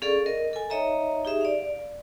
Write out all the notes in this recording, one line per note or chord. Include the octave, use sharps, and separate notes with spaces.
C#4 G#4 A4 D5 F5 C#6
A#4 D#5
A4 G#5
D#4 C#5 D#5 E5 A#5
D#4 G4 G#4 E5
D5 F5